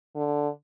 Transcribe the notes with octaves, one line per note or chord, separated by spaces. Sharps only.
D3